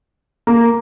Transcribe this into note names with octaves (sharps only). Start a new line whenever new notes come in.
A#3